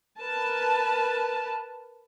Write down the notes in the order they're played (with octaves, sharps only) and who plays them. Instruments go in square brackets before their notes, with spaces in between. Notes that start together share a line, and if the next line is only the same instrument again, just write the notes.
[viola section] A#4 B4 A5